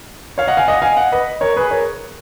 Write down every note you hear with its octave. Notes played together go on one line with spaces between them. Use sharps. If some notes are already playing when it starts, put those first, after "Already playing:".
C#5 F5
D#5 F#5
F5 G#5
D#5 F#5
F5 G#5
D#5 F#5
B4 D#5
A#4 C#5
G#4 B4
A#4 C#5